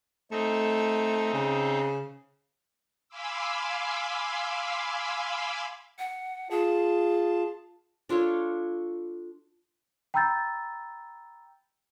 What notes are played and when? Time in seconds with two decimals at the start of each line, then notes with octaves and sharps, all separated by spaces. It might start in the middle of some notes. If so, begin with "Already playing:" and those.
0.32 A3 C4 D#4
1.33 C#3
3.09 F5 G#5 B5 C6 D6 E6
5.99 F#5
6.51 F4 G#4 A5
8.09 D4 F4 A4 C#5
10.14 G5 A#5 B5 E6 G6 A6